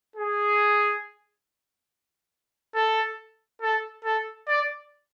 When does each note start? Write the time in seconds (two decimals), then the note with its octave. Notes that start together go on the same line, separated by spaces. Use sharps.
0.16 G#4
2.75 A4
3.62 A4
4.04 A4
4.48 D5